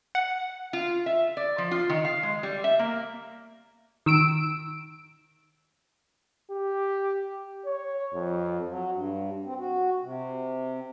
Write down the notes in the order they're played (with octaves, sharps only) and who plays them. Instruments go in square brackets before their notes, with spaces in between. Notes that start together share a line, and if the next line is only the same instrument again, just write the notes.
[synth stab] F#5
[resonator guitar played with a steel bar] F4
E5
D5
F3
F4
D#3
F5
G#3
G3
E5
A#3
[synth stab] D#3 E6 D7
[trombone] G4
C#5
F2
[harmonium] F#3
G2
C4
F#4
C3